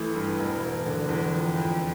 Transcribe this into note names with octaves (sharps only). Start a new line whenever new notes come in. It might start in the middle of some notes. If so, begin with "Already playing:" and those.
Already playing: A1 E3 A3
G2
E1
E1
D3
E2
F2
F2